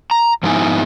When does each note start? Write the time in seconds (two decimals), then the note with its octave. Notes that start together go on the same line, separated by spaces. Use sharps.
0.11 A#5
0.43 G#2 F3 B3 D#4 E4 G#5